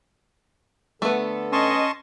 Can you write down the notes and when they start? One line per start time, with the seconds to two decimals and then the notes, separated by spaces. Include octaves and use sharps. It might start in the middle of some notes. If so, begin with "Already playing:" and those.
1.02 D3 A3 B3 A4
1.53 C#4 D#5 A5 C6 C#6